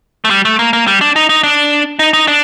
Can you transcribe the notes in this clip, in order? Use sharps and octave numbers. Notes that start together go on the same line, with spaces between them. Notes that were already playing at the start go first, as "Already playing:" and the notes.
A3
G3
A3
A#3
A#3
G3
D4
D#4
D#4
D4
D#4
D#4
D4